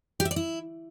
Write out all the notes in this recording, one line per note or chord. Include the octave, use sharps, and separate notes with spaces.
G4
E5
D5
E4